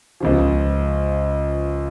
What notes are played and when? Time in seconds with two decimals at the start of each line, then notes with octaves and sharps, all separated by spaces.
0.20 C#2 C#3 F3